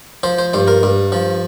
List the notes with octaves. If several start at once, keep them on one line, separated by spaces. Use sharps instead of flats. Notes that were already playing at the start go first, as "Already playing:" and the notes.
F3 C5
C5
G2 C5
A#4
G2
F3